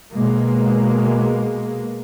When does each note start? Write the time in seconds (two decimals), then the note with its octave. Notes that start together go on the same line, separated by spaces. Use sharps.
0.13 B2 G#3 A#3